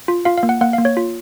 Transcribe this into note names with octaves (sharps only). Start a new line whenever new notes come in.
F4
F4 F5
F5
A#3
F#5
A#3 F#5
F5
A#3
C#5
F4